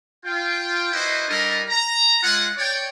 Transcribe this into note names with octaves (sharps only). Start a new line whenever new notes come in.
F4 G5
D#4 E4 F#4 B4 C5 D#5
G3 D4 E4 A4 A#4 D#5
A#5
G#3 F4 G#4 F#5
C#5 D5 G5